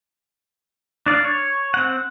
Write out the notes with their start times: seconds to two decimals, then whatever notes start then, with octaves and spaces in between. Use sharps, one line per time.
1.06 D4 D5 F5
1.24 C#5
1.74 C4 F#5